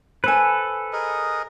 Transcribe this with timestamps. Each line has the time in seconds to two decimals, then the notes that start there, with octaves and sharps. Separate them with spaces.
0.24 A4 B4 C5 G#5
0.93 G#4 A#4 D#5